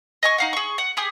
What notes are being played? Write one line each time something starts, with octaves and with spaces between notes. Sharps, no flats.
D#5 G#5 C#6
D#4 F5 F#5
G#4 C#6
F#5
G4 G#4 D#6